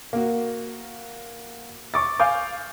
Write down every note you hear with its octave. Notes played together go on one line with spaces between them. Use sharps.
A#3 F#4
C#6 D6 A6
F5 G#5 D6 G6